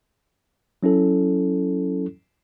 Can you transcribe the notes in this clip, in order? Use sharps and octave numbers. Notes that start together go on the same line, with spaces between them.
F#3 C#4 E4 A4